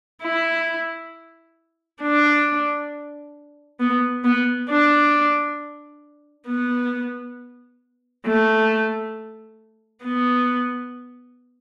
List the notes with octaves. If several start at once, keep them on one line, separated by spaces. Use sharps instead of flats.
E4
D4
B3
B3
D4
B3
A3
B3